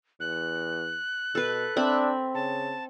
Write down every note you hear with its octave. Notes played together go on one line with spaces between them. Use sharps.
E2 F#6
B2 A4 B4
C4 D4 E5 B5
C#3 A5